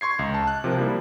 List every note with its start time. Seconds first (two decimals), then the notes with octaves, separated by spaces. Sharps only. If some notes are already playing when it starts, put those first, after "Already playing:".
0.01 C6 C#6 G#6 C7
0.19 C#2
0.34 A5
0.47 F#6
0.64 C3 F3 A#4
0.77 F3 G3 A#3 E4